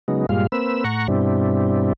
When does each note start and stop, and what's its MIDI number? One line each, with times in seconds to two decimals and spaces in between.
0.08 0.26 49
0.08 0.26 54
0.08 0.26 56
0.08 0.26 59
0.08 0.26 63
0.29 0.47 43
0.29 0.47 46
0.29 0.47 55
0.29 0.47 56
0.29 0.47 65
0.29 0.47 77
0.52 0.84 58
0.52 0.84 60
0.52 0.84 71
0.52 0.84 88
0.84 1.07 45
0.84 1.07 78
0.84 1.07 82
0.84 1.07 85
1.08 1.93 43
1.08 1.93 47
1.08 1.93 55
1.08 1.93 60
1.08 1.93 62
1.08 1.93 64